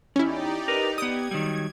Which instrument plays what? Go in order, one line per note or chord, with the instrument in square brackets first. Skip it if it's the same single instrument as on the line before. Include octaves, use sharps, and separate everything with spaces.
[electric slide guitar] E2 [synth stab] C#4 E4 [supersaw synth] D#4 G4 D5
[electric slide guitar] A#4 B4
[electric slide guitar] B3 G4 [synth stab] D#6 [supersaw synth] G#6
[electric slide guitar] D#3 F#3 G3